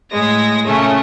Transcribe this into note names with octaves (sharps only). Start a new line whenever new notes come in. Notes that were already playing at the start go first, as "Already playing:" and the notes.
A2 G#3 A#6
A#2 C#3 A3 C#4